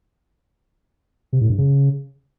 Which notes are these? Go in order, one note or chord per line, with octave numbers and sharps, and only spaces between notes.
C3
A2
G2
C#3